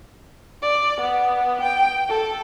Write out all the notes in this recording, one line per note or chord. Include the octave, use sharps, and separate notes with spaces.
D5
B3
G5
A4